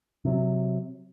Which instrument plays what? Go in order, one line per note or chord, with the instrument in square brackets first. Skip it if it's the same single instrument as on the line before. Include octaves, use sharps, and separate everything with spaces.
[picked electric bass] C3 F#3